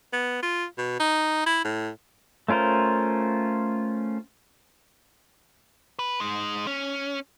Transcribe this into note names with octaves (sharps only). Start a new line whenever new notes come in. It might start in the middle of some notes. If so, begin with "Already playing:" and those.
B3
F4
B2
D#4
E4
A2
A3 C#4 F4 A#4 C5
B4
G#3 D#4
C#4